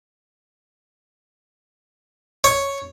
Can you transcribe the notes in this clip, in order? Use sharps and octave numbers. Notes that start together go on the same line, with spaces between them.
C#5